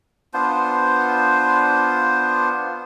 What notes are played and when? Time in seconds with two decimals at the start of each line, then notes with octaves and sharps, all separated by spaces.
0.34 B3 D4 F4 C5